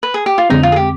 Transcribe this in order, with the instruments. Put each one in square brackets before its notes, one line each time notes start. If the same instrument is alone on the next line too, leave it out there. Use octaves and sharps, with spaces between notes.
[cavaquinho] B4
G#4
G4
F4
[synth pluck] F2 D3 G#3 C4 [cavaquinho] D#4
[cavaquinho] F4
G#4
G4